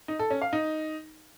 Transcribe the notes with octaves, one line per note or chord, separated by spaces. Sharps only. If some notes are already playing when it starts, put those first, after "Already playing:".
D#4
A4
C#4
F5
D#4